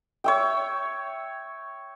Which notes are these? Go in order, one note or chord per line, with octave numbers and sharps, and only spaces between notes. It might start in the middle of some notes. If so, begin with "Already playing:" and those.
C#5 E5 G5